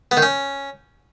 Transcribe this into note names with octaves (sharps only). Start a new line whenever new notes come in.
B3
D#3
C#4